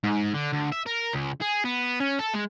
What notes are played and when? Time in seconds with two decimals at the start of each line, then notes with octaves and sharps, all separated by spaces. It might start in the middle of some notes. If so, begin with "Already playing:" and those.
0.04 G#2
0.34 D3
0.52 D2
0.72 E5
0.86 A#4
1.13 C#2
1.41 G#4
1.65 B3
2.00 C#4
2.19 A4
2.34 G#3